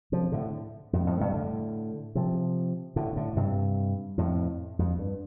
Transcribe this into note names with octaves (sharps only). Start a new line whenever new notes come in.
C3 F3
A2 D3
F2 A2
F2 A2
G2 C3
A2 D3
C3 F3
A2 D3
A2 D3
G2 C3
F2 A2
F2
G2